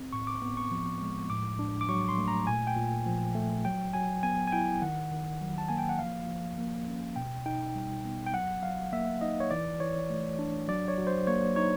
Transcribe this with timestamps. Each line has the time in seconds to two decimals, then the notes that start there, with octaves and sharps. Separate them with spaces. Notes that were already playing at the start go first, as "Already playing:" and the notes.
Already playing: C4
0.13 A2 C#6
0.27 D6
0.42 B3
0.57 C#6
0.71 F3
1.01 G#3
1.30 A2 D6
1.59 D4
1.81 D6
1.89 F#3 C#6
2.08 C6
2.18 A3
2.28 A#5
2.47 A#2 G#5
2.67 G5
2.76 A#2
3.06 F3
3.35 A3
3.64 F#3 G5
3.93 F#3 G#5
4.23 B3 G#5
4.48 G#5
4.52 E4 G5
4.82 D#3 F#5
5.11 D#3
5.41 F#3
5.58 A5
5.69 A#3 G#5
5.78 G5
5.89 F#5
5.99 F3 F5
6.29 F3
6.58 A#3
6.87 C#4
7.16 B2 G5
7.46 D#4 G5
7.75 G3
8.05 B3
8.26 G5
8.33 F#3 F#5
8.63 F#3 F5
8.93 A#3 E5
9.21 D#4 D#5
9.40 C#5
9.51 E3 D5
9.80 E3 C#5
10.10 A3
10.39 D4
10.68 F#3 D5
10.88 C#5
10.98 F#3
11.07 C5
11.27 A#3 C#5
11.56 D#4 C#5